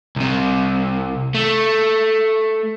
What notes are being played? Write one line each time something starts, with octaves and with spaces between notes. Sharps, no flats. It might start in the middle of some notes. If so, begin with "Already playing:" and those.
C2 C3
A3